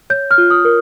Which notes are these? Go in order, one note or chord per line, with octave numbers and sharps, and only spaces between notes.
C#5 G6
F6
F4
D#6
A#4